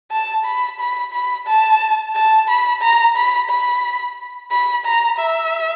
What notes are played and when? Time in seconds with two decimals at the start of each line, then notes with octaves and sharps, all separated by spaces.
0.11 A5
0.45 B5
0.80 B5
1.13 B5
1.47 A5
2.15 A5
2.49 B5
2.82 A#5
3.16 B5
3.50 B5
4.51 B5
4.86 A#5
5.19 E5